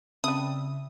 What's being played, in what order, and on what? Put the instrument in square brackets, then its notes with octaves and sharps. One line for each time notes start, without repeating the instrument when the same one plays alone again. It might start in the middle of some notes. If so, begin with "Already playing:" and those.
[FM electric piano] C#3 E5 [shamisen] G3 E4 [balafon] C4 [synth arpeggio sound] D#6